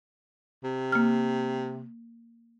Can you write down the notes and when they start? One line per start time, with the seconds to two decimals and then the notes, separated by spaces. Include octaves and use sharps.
0.64 C3
0.92 A#3 F6